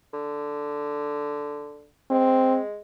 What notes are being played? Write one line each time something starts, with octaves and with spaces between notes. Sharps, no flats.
D3
G#3 C4